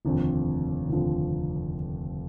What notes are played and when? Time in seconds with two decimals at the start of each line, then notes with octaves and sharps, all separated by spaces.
0.05 F1 D#2 D3 F3 C4
0.89 F1 D#2 D3 F3 C4